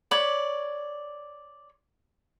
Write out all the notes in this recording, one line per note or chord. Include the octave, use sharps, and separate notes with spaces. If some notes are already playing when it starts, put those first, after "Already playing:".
C#5 D5 B5